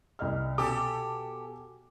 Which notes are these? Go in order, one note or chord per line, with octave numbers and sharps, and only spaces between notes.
C2 D#5 F6
B2 G4 A4 G#5 D6